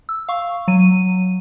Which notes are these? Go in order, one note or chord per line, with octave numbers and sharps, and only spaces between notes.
E6
F5 C#6
F#3 D#7